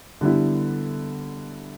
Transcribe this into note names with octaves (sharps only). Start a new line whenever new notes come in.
D3 G3 B3 E4